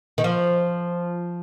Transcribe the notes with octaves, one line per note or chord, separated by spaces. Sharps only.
D#3
F3